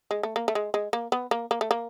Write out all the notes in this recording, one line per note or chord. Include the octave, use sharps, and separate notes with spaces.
G#3
A3
A#3
A3
G#3
G#3
A#3
B3
A#3
A#3
A3
A#3